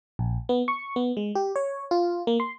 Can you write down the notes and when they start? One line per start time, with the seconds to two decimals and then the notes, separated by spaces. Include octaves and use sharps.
0.19 A#1
0.49 B3
0.68 C#6
0.96 B3
1.17 G#3
1.35 G4
1.56 C#5
1.91 F4
2.27 A#3
2.40 C6